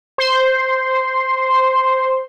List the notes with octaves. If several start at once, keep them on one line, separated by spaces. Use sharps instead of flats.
C5 C6